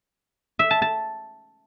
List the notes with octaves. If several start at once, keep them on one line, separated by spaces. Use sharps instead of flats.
E5
A5
A5